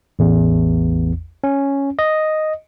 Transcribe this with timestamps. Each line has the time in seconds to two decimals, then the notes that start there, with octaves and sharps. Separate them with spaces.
0.19 A1 E2
1.44 C#4
1.99 D#5